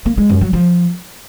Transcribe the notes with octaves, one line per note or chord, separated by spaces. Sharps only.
A#3
G#3
F#2
F#3
F3